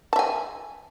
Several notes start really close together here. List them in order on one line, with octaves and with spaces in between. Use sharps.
A5 E5 G#5